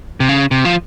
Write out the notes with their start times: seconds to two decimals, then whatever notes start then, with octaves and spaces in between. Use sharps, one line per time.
0.20 C3
0.29 C#3
0.51 C3
0.65 F3